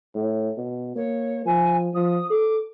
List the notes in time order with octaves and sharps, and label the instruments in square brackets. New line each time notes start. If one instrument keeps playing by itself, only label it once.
[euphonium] A2
B2
[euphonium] A#3 [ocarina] C#5
[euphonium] F3 [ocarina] G#5
[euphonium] F3 [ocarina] D#6
[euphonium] A4 [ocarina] D6